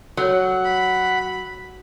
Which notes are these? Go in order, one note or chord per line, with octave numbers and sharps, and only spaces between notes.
F#3 A4 C#5 F#5
B5